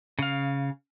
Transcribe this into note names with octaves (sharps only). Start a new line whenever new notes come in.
C#3 F5